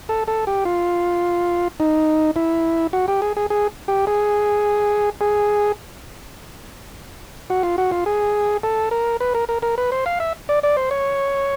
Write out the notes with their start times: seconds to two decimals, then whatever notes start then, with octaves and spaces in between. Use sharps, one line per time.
0.09 A4
0.28 A4
0.47 G4
0.65 F4
1.80 D#4
2.36 E4
2.93 F#4
3.08 G4
3.22 G#4
3.37 G#4
3.50 G#4
3.88 G4
4.07 G#4
5.21 G#4
7.50 F#4
7.63 F4
7.78 F#4
7.91 F4
8.06 G#4
8.63 A4
8.91 A#4
9.21 B4
9.35 A#4
9.49 A#4
9.62 A#4
9.78 B4
9.92 C5
10.06 F5
10.20 E5
10.49 D5
10.63 D5
10.77 C5
10.91 C#5